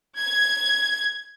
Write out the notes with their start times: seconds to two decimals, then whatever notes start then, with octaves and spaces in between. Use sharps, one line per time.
0.19 G#6